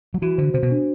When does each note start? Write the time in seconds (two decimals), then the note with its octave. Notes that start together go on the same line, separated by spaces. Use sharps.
0.14 F#3
0.22 E3 F#4
0.38 D3 C5
0.54 C3 C5
0.63 B2
0.71 D4